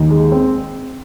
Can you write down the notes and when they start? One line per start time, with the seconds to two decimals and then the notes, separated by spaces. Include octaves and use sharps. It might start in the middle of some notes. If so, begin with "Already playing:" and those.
Already playing: D#2
0.10 G#3
0.32 C4